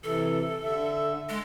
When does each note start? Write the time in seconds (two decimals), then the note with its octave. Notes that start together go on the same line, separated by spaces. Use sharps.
0.04 C3 E3 A4
0.63 D3 E5
1.29 G#3